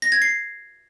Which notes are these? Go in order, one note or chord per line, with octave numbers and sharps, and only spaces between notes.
A#6
G#6
C7